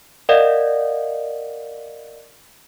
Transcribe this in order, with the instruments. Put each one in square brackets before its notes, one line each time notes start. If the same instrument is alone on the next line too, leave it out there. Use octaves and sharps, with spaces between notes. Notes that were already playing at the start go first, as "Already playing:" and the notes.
[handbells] A#4 D5 D#5 F5 F#5